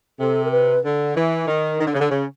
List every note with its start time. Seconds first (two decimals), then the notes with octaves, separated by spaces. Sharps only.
0.19 C3 A4
0.45 A#4
0.51 B4
0.83 D3
1.14 E3
1.46 D#3
1.78 D#3
1.85 D3
1.93 C#3
1.99 D3
2.09 C#3